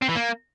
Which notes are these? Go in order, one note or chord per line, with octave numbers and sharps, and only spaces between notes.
C4
E3
A#3